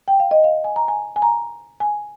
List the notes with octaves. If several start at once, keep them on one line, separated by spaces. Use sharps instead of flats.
G5
F5
D#5
F5
G#5
A#5
G#5
G#5
A#5
G#5